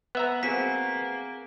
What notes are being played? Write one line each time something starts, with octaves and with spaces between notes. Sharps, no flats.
B3 E5 A#5
A#3 C4 F#4 G#4 B6